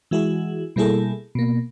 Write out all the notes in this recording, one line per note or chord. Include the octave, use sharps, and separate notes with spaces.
E3 G#3 E4 F#4 G#4
B2 G3 A#3 E4 G#4 A4
B2 A#3